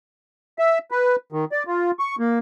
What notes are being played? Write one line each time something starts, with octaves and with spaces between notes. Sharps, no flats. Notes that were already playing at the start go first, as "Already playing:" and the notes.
E5
B4
D#3
D5
F4
C#6
A#3